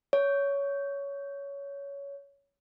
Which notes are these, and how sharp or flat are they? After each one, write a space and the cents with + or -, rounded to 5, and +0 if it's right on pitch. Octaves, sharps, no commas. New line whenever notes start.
C#5 +15